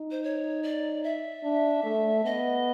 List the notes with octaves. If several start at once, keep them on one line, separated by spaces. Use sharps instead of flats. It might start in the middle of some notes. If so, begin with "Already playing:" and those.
Already playing: D#4
C5
C#5
D5
E5
D4
A3
B3 D#5